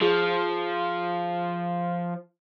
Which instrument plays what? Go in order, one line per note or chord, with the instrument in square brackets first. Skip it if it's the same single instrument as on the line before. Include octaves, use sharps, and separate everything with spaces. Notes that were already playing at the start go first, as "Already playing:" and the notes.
[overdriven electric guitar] F3 [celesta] G#4